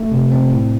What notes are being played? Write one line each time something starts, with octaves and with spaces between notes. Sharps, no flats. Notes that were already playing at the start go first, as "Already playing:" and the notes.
Already playing: A3
C3
C4
A2